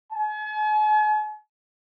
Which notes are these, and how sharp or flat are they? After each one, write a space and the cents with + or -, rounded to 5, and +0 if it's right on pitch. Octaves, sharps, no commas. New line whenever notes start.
G#5 +45